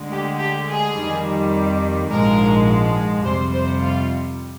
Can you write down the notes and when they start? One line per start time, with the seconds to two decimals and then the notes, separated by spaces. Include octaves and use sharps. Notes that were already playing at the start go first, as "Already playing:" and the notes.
Already playing: D2 D3 G#3
0.11 G4
0.39 G4
0.68 G#4
0.96 F2 D#3 G3
2.10 A#1 G#2 F3 G#3 A#4
3.24 F2 C3 G3 C5
3.53 C5
3.81 F4